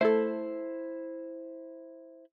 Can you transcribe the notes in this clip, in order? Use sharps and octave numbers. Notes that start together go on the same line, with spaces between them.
A3 E4 A4 C5